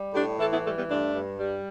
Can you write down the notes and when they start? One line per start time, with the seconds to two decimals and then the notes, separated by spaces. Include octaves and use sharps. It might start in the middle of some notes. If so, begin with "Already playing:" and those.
Already playing: G3
0.14 A2 D4 G4
0.39 E3 E4 A4
0.51 B3 E4
0.63 G3 A3
0.76 G3 B3
0.88 G2 A3 D4
1.13 G2
1.37 G3